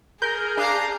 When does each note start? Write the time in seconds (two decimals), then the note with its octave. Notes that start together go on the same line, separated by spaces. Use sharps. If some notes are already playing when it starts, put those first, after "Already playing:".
0.22 G#4 A#4 G6
0.57 D4 F5 A#5